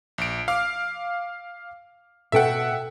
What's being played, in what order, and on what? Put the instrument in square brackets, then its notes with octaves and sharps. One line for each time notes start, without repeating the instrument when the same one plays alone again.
[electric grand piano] A#1 D7
F5 D6 F6
[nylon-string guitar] B2 A4 G5 [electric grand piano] E5 F#5